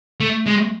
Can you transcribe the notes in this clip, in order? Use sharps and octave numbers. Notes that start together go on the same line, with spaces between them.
A3
G#3